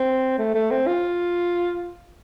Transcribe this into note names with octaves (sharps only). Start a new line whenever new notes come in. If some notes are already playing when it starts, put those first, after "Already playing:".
Already playing: C4
A3
A3
C4
F4